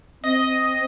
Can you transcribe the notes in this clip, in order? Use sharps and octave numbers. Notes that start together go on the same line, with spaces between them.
C4 D#5